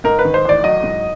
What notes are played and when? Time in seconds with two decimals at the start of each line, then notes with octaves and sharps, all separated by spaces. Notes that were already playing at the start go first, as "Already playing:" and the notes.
0.04 G#2 A#4
0.19 B4
0.25 D#3
0.34 C5
0.45 A1 D5
0.64 F#3 D#5
0.83 G#2